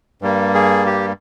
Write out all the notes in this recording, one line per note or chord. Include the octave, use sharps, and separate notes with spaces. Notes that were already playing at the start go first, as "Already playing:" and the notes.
G2 G3 A#3
G#4
G4